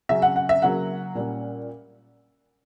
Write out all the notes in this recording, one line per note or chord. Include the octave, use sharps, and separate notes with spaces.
C#3 F#3 C#4 E5
F#5
F#5
E5
C#3 F#3 A#3 F#5
A#2 G3 C#4